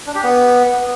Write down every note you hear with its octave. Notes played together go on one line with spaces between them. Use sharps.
D4
G4
B3